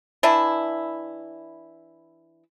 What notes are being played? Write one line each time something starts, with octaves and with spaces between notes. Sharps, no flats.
E3 D4 E4